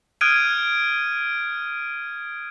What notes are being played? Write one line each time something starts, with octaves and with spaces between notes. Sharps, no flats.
D#6 F6 F#6 G#6 D7 D#7